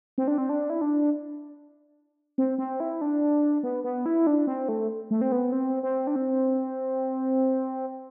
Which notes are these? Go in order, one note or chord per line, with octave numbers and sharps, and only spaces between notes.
C4
D4
C4
D4
E4
D4
C4
C4
E4
D4
B3
B3
E4
D4
C4
A3
A3
C4
B3
C4
C4
D4
C4